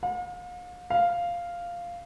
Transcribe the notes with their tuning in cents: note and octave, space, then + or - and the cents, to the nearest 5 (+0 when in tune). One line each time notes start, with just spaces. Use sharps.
F5 +40
F5 -5